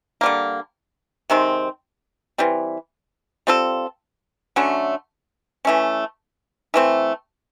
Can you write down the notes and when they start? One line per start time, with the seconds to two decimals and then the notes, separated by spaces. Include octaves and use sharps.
0.21 D3 G3 A#3
1.30 C3 D#3 G#3 C4
2.38 E3 G3 C4
3.47 G3 C4 F4 A4
4.56 D3 F#3 A3 C#4
5.65 E3 A3 C#4
6.74 E3 A3 C4